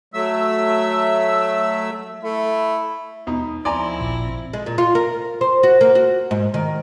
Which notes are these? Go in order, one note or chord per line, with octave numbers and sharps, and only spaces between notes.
F#3 A3 E5 E6
A3 E4
D#2 B2 D#4
D2 F3 C4 E4 D5 G#5 A#5 C6
A1 A#2
G#3
A#2
F4
A#4
C5
F#4
A#3
F#4
G#2
D#3